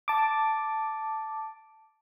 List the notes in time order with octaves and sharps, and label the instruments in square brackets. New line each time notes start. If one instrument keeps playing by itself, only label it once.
[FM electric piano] A5 D6